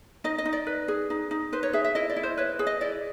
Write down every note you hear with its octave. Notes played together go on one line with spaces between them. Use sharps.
D#4 D#5
D#5
D#4
D5
B4
G#4
D#4
D#4
B4 C5
C#5
G#4 E5
E5
E4 D#5
D5
E4
C5
B4 C#5
G#4
D#5
E4 D5